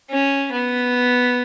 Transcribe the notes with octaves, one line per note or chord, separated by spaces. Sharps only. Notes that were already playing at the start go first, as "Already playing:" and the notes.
C#4
B3